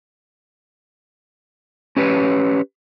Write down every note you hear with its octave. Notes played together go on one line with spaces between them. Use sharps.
C#4 G4 B4 C#5